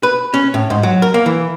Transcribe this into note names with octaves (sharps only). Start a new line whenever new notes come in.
B4
C#4
A2
G#2
F#3
A#4
A#3
E3